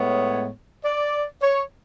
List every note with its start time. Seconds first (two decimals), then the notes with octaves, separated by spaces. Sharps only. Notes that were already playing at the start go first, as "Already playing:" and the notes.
Already playing: A2 G#3 B3 C#5
0.84 D5
1.42 C#5